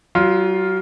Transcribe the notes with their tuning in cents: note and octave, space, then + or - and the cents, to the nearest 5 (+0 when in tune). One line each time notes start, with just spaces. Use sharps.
F#3 +40 F4 +0